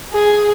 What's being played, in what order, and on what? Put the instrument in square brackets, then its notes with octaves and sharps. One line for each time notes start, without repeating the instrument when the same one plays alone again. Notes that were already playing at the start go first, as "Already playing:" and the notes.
[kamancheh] G#4